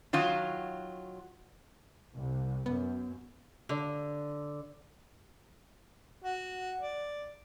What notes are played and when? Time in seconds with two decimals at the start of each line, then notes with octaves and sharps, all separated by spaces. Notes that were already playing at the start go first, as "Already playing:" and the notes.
0.13 D#3 F#3 F4 F#4
2.14 C2
2.66 F#2 B3
3.69 D3
6.25 F#4
6.80 D5